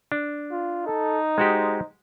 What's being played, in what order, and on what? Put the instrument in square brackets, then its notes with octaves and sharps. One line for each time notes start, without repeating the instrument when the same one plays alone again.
[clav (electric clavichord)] D4
[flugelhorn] F4
[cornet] D#4 [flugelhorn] A4
[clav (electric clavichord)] G#3 F#4 G4 [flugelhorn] C5